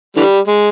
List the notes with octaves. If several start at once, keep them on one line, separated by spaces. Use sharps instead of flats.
D3 E3 G3
G#3